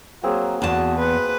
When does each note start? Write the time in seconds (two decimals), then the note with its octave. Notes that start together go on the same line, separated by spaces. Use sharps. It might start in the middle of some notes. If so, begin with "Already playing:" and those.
0.23 F#3 A#3 C4 G#4
0.62 E2 F#4 A5
0.98 B4 C6